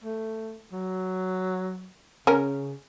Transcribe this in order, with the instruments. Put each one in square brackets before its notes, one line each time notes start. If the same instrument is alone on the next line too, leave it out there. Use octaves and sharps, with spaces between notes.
[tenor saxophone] A3
F#3
[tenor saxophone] C#3 [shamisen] C#4 A#4